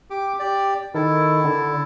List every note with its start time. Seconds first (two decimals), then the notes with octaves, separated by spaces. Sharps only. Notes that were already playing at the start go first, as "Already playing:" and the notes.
0.10 G4 D6
0.39 G4 D5
0.94 D#3 E4 A4
1.44 D3